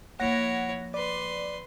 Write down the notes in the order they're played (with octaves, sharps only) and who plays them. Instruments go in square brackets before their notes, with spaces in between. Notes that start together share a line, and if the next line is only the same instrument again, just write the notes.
[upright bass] F3 A#3 [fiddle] E4 C#5 [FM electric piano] F#5 A#6
[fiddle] B4 C6 [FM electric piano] D5